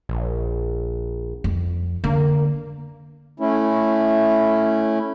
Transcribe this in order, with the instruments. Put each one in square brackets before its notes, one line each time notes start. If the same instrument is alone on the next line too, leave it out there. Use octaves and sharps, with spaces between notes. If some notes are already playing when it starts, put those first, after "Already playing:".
[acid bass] A#1
[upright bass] F2
[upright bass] D3 [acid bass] A#3
[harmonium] A3 C#4 E4